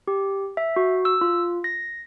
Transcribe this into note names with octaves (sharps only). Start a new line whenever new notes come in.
G4
E5
F#4
E6
F4
A#6